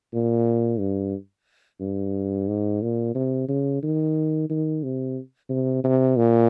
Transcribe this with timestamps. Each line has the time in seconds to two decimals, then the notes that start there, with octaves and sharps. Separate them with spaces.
0.13 A#2
0.79 G2
1.80 G2
2.48 G#2
2.82 A#2
3.15 C3
3.48 C#3
3.83 D#3
4.50 D#3
4.83 C3
5.49 C3
5.84 C3
6.17 A#2